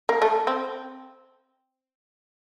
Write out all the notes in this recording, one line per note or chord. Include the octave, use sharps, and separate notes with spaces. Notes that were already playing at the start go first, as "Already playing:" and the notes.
A#3
A3
C4